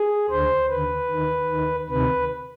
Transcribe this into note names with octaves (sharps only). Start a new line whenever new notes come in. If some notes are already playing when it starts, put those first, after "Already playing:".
Already playing: G#4
D2 D3 C5
D#2 D3 B4
D#2 D#3
D#2 D#3
D2 C3 D#3 B4